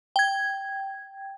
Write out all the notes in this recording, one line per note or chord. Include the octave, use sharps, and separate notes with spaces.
G5 G#6